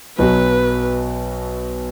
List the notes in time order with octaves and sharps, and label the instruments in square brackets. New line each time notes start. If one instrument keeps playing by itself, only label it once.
[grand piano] B1 B2 F#3 [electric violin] B4